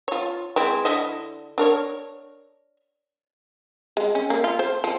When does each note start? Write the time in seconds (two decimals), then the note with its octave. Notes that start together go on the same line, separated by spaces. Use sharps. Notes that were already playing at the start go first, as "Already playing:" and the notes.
0.08 F4 C#5
0.56 G#3 C4 E4
0.85 D3 E4 D#5
1.58 D4 A#4 C#5
3.97 G#3
4.15 C#4
4.30 A#3
4.44 F4
4.59 C5
4.84 F3